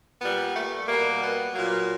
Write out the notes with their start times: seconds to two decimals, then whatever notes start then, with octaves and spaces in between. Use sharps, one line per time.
0.20 A#2 G3 B3
0.54 A3
0.87 B2 G3 A#3
1.21 B3
1.54 A#2 F#3 A#3